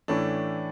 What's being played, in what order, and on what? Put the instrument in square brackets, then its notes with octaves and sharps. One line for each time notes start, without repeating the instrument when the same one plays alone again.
[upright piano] A2 E3 A3 C#4 [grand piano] D4